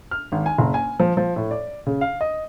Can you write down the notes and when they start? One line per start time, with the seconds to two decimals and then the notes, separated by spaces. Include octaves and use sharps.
0.11 F6
0.32 G#1
0.46 G#5
0.58 F#1
0.74 G#5
1.00 F3
1.17 F3
1.36 A2
1.51 D5
1.87 C#3
2.01 F5
2.21 D#5